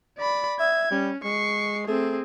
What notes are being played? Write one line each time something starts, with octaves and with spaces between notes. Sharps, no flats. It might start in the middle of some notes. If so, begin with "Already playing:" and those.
D5 B5
E5 G#6
G3 C#4
G#3 C#6 C7
A3 C4 G#4